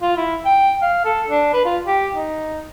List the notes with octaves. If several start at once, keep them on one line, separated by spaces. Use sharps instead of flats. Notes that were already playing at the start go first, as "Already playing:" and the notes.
F4
E4
G5
F5
A4
D4
B4
F4
G4
D#4